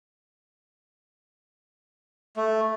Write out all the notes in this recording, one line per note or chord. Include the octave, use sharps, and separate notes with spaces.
A3